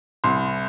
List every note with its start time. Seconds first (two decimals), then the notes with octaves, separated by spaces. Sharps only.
0.24 C2 C6